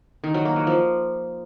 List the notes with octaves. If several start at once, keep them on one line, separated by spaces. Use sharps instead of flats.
D#3
F#3
A#3
F#3
F3